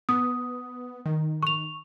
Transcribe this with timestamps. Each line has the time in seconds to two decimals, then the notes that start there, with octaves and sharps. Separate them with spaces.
0.09 B3 D#6
1.06 D#3
1.43 C#6 F7